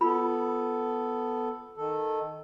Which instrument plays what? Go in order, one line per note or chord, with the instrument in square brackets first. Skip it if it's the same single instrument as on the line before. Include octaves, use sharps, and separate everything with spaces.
[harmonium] B3 A4 [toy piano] F4 B5
[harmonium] D#3 A4